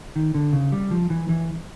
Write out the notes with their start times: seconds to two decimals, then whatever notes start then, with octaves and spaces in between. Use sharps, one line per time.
0.16 D#3
0.35 D3
0.53 C#3
0.72 G3
0.91 F3
1.10 E3
1.29 E3